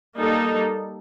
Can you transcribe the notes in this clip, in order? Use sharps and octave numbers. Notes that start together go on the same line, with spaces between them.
G3 A#3 D#4 A4